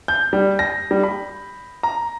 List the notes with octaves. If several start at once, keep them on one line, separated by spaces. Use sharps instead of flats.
G6
G3
A#6
G3
B5
A#5